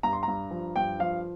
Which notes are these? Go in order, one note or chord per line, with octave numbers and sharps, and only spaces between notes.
G2 A#5
C6
G2 A#5
F3
G2 G5
F3 F5